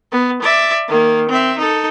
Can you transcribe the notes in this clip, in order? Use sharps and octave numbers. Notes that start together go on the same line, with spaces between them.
B3
D5 E5
D#3 A#3
C4 E5
D#4 A4